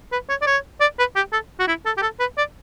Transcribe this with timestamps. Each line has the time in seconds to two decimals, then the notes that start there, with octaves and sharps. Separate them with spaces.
0.12 B4
0.29 C#5
0.42 D5
0.46 C#5
0.81 D5
0.99 B4
1.16 G4
1.32 A4
1.59 F#4
1.68 E4
1.86 A4
1.97 G4
2.02 A4
2.20 B4
2.38 D5